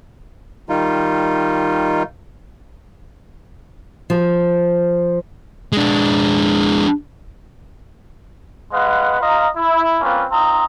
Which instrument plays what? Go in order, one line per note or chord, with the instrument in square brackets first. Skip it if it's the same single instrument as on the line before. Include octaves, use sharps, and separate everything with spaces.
[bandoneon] D#3 G3 D#4 F4
[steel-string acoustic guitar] F3
[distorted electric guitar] G#3 D4
[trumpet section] G#3 B4 D#5 F5 F#5
F4 D#5 F5 A#5
E4
A#3 C4 C#4 F4 B4
C4 D#4 F4 A#5 D#6